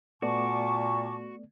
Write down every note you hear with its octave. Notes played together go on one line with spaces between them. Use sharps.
A#2 A3 B3 F#4 D5 A5 C#6 D6